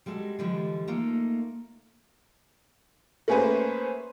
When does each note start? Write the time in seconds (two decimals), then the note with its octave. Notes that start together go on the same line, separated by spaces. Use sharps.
0.06 G3 G#3 F#4 A4
0.39 D3 E3 F3 G3 G#3
0.88 A3 A#3 D#4 F4 A4
3.28 A3 A#3 C#4 G#4 B4 C5